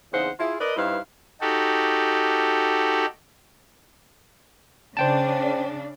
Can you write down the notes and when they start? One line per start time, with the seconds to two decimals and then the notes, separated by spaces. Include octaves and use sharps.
0.13 E2 C#3 C4 D#4 C5 F#5
0.39 E4 F4 G#4
0.60 A#4 B4 D5 D#5
0.77 G2 D#4 E4 B4 C5 F5
1.41 D#4 F#4 G4 A4
4.97 C#3 D4 C5 G5 A5